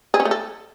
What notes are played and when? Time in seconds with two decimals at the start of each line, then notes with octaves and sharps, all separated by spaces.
0.14 G#4
0.20 C#4
0.25 A3
0.31 A4